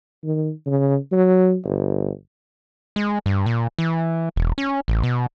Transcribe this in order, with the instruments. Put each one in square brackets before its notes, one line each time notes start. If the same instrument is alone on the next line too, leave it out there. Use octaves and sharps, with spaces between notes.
[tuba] D#3
C#3
F#3
G1
[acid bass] G#3
G2
A#2
E3
E1
C#4
A1
B2